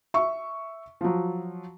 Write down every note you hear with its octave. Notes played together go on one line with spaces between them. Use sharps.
E5 C#6
F3 F#3